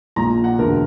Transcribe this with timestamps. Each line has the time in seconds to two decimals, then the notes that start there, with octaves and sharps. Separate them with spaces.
0.16 A#1 A#2 A#5
0.44 F#5
0.58 E1 D2 D3 A#4